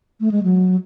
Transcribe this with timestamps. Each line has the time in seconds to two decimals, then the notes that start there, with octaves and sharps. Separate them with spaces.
0.20 A3
0.31 G#3
0.43 F#3